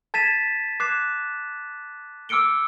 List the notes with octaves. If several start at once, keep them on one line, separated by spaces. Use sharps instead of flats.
A5 G#6 A6 B6 D#7 E7
D6 F#6 G#6 C7 E7
D6 E6 F6 C#7 D7 G7